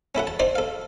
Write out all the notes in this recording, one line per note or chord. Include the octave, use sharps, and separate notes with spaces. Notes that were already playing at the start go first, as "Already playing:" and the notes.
C#4 E4 A4 F#5
A5
D#4 C5 D5 C6
A4 F5